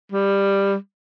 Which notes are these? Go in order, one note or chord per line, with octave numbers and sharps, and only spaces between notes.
G3